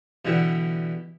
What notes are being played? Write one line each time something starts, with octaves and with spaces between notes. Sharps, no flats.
B2 D3 E3 G3 E4